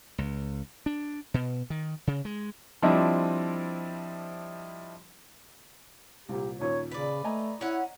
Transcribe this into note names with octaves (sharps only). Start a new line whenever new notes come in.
C#2
D4
B2
D#3
C#3
G#3
F3 G3 C4 D4 E4 D#5
C2 A#2 G4
D#2 A#2 C#4 C#5
C#3 B4 D5
A3 D#5 G#5 A#5
C#4 E4 F#5